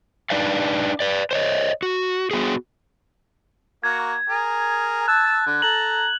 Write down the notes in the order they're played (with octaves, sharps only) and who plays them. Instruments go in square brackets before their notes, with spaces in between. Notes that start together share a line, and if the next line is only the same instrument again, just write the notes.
[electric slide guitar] D4 D#4 B4 D5 F5
B4 D5
C5 C#5 D#5
F#4
B3 F#4 G#4
[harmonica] A#3 F#4 [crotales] G#6
[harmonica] G#4 A#4
[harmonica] A5 E6 [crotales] F#6
[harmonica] D3
[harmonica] A4 A#5 [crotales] F#7